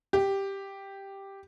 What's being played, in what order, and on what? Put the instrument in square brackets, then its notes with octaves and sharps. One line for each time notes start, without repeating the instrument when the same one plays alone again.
[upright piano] G4